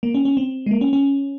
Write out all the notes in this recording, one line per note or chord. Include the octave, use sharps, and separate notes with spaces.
A#3
C#4
C#4
C4
G#3
A#3
C#4
C#4